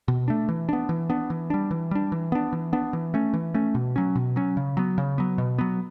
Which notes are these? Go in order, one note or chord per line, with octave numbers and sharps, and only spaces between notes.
B2
A3 D4
E3
B3 D4
E3
B3 D4
E3
G3 D4
E3
G3 D4
E3
B3 D4
E3
B3 D4
E3
A3 C#4
E3
A3 C#4
B2
F#3 C#4
B2
F#3 C#4
C#3
F#3 B3
C#3
F#3 B3
B2
F#3 B3